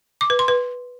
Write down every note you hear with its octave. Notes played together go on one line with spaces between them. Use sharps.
D6
B4
C6
B4